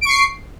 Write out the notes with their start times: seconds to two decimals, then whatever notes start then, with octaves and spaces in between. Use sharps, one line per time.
0.01 D7
0.05 C#6
0.09 C7